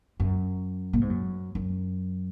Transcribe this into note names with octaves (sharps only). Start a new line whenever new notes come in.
F#2
A#2
G#2
F#2
F#2